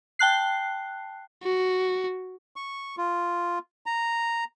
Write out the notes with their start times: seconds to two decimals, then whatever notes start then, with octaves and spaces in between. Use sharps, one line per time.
0.19 G5 A5 F#6 C7
1.43 F#4
2.56 C#6
2.98 F4
3.86 A#5